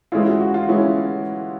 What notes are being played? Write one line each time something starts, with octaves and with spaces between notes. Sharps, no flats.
E3 G#3 C#4 E4 F4
F#4
F#4
F4
E3 G#3 C#4 E4